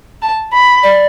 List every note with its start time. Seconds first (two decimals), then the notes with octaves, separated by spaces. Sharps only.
0.22 A5
0.53 B5
0.83 D5